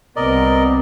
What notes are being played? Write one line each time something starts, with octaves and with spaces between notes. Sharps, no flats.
C2 B3 C4 A#4 D5 D#5